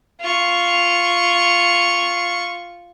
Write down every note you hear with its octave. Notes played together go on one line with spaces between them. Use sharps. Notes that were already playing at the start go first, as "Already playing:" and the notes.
F4 C#6